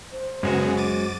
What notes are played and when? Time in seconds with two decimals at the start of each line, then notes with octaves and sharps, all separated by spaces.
0.12 C5
0.43 F#2 C#3 G#3 B3 F#4 G#4
0.77 D6 A6 D#7